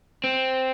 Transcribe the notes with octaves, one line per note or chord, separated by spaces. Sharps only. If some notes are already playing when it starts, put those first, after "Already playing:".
C4